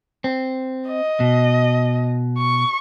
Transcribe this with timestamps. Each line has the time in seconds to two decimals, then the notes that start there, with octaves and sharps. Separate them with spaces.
0.24 C4
0.88 D#5
1.20 B2
2.38 C#6